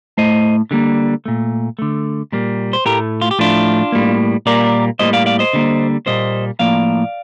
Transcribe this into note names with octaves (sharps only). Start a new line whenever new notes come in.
A2 A3 C5 D#5
D3 G3 A#3
A#2 A3
D3 A3
A#2 G3 A#3
C5
A2 A3 G4 A#4
F4
G4
A2 F3 A3 D4 F4
A2 G3 A#3
A#2 G3 A#3 A#4 D5
A2 G3 A#3 C5 D#5
D5 F5
D5 F5
C5 D#5
D3 G3 A#3
A#2 G3 A#3 C5 D#5
A2 F3 A#3 D5 F5